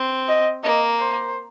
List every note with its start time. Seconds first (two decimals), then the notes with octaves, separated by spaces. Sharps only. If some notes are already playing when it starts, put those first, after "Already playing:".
Already playing: C4
0.28 D#5
0.63 A#3 D#5
0.99 C5